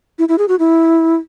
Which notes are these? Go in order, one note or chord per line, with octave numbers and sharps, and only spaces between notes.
E4
E4
G#4
F#4
E4